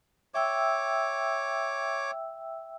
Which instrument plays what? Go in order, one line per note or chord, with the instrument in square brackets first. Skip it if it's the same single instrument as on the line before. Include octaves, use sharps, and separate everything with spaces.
[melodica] C#5 D6 [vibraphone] E5 G5 E6